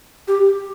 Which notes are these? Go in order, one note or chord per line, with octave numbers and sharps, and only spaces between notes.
G4